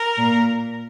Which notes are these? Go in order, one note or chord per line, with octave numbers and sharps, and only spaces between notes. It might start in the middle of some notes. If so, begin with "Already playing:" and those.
Already playing: A#4
A#2